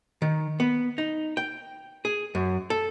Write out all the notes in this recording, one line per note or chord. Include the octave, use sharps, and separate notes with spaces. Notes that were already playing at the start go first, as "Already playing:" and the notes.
D#3
B3
D#4
G5
G#4
F#2
A4